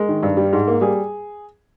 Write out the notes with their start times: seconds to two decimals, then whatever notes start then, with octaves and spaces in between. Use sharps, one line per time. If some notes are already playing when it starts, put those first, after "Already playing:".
Already playing: G#3 A#4
0.09 D#3
0.23 G2
0.37 G3
0.53 G#2
0.68 A#3
0.81 G3 G#4